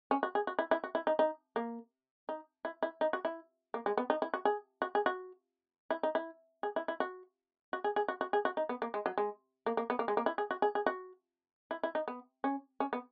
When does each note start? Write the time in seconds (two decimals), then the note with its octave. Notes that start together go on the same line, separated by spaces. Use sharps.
0.11 C#4
0.23 F#4
0.35 G#4
0.47 F#4
0.59 E4
0.71 E4
0.84 F#4
0.95 E4
1.07 D#4
1.19 D#4
1.56 A#3
2.29 D#4
2.65 E4
2.82 E4
3.01 D#4
3.13 F#4
3.25 E4
3.74 A#3
3.86 G#3
3.97 B3
4.10 D#4
4.22 E4
4.34 F#4
4.45 G#4
4.82 F#4
4.95 G#4
5.06 F#4
5.90 E4
6.03 D#4
6.15 E4
6.63 G#4
6.76 E4
6.88 E4
7.00 F#4
7.73 F#4
7.84 G#4
7.96 G#4
8.08 F#4
8.21 F#4
8.33 G#4
8.45 F#4
8.57 D#4
8.69 B3
8.82 A#3
8.94 G#3
9.06 F#3
9.18 G#3
9.66 A#3
9.77 A#3
9.90 B3
9.99 A#3
10.08 G#3
10.17 A#3
10.26 E4
10.38 G#4
10.51 F#4
10.62 G#4
10.75 G#4
10.86 F#4
11.71 E4
11.83 E4
11.95 D#4
12.08 B3
12.44 C#4
12.80 C#4
12.93 B3